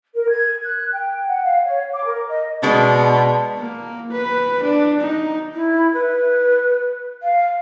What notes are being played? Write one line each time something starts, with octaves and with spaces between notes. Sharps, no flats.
A#4
G#6
F#6
G5
F#5
F5
C#5
D6
A#4
D#5
B2 G#3 D4
A#3
B4
D4
D#4
E4
B4
F5